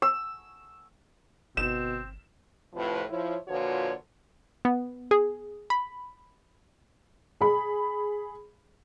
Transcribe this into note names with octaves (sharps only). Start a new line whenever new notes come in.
E6
G1 B2 C4 E7
F2 A2 C3 F3 B4
F3 E4 C#5
A#2 D3 F3 F#4 B4 C#5
B3
G#4
B5
G#4 B5